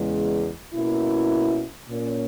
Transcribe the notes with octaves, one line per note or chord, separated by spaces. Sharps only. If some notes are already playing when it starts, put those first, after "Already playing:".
Already playing: E2 C#3 G#3
B2 A#3 C#4 E4
A#2 A#3 C#4